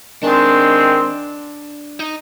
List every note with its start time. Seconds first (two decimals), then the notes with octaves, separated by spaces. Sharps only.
0.23 D#3 G#3 C4 D4
2.00 D#4